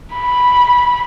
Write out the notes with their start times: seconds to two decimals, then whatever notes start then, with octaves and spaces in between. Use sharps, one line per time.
0.14 B5